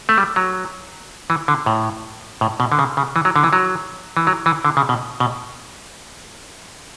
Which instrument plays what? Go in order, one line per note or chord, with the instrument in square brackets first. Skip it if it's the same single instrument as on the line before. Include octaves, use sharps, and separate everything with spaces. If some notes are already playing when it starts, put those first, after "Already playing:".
[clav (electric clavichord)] A3
G3
F#3
E3
D3
A2
A2
B2
D3
C#3
C#3
E3
F#3
D3
E3
F#3
E3
F#3
E3
D3
C#3
B2
B2